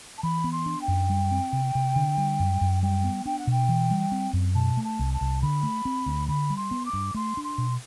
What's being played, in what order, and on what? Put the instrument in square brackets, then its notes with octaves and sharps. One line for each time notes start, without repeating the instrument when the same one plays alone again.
[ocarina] A5
[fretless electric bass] E3 [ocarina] B5
[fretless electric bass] B3
[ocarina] C6
[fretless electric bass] D4
[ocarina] G5
[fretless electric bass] F#2
G3
C4
C3
C3
D3
G3
F#2
F#2
[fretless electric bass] G3 [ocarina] G5
[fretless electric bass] B3
[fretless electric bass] D4 [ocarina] G5
[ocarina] F#5
[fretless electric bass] B2 [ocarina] G5
[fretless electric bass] E3
G3
C4
F#2
[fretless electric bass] B2 [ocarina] A5
[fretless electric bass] A3
[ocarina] A5
[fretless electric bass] C2
[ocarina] A5
[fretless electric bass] C2
[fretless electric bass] D3 [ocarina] B5
[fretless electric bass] A3
C4
D2
[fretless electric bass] D3 [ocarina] B5
[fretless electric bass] G3
[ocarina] C6
[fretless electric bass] B3
[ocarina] D6
[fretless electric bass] G2
[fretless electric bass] A3 [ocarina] C6
[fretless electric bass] D4
[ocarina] C6
[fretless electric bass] B2